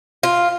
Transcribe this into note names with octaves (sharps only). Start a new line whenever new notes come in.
F4